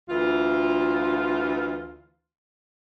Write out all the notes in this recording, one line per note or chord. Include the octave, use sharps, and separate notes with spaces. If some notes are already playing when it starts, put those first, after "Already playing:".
D2 E3 F4